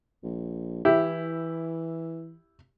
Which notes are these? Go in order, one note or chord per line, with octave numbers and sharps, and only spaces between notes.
A#1
E3 E4 G4